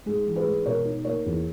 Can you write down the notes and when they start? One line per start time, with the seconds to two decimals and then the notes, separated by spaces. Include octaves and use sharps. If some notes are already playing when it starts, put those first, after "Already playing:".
0.06 G#2 G#4
0.26 E3
0.36 G#4 B4
0.47 G#2
0.65 B2 A#4 C#5
0.85 D#4
1.05 A#3 A#4 C#5
1.26 E2